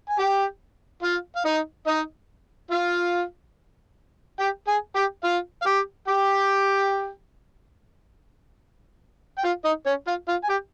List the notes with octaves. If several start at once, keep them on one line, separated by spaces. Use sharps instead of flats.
G#5
G4 G5
F4 F5
F5
D#4 D#5
D#4 D#5
F4 F5
G4 G5
G#4 G#5
G4 G5
F4 F5
F5
G4 G5
G4 G5
G5
F4 F5
D#4 D#5
C#4 C#5
F4 F5
F4 F5
G#5
G4 G5